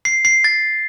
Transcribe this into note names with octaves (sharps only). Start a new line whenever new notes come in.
C7
C7
A6